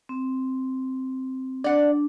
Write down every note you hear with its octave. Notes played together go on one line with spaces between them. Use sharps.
C4
D4 D5 F#5